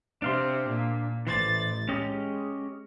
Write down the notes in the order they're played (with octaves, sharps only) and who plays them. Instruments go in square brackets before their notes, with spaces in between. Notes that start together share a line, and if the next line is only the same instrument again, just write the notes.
[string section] C3 C4 [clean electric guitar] D4 F5 C6
[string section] A#2
[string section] A1 A6 [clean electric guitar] E3 C5 D5
[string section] G#3 [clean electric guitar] C#4 G4 D#5